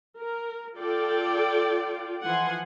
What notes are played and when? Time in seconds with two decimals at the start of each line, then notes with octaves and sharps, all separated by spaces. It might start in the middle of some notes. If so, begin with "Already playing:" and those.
0.18 A#4
0.77 F4 A4 D5 G5
2.24 E3 F3 F#5 G#5 C6